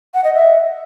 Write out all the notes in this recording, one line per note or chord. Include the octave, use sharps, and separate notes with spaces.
F#5
D#5
E5